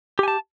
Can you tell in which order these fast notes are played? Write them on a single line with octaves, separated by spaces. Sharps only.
G4 G#5 A5